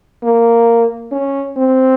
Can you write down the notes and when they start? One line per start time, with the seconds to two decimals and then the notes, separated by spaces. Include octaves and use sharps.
0.23 A#3
1.12 C#4
1.56 C4